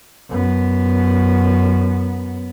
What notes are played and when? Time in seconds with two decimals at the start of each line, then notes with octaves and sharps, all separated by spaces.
0.29 F#2 B3